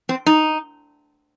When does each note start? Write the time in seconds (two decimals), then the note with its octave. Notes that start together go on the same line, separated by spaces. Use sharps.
0.09 C4
0.26 D#4